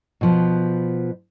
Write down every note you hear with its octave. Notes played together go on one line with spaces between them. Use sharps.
B2 F3 B4